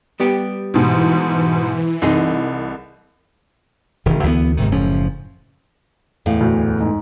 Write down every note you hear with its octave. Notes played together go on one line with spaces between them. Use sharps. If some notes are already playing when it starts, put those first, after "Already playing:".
G3 B3 G4
G#2 B2 E3
C2 C4 D#4 G#4
E1 D#3
D2 E3 F3 B3
G#1 G#2 C3 D#3
F#1 A2 F3 C#4
E2 A2 F5
D2
G#2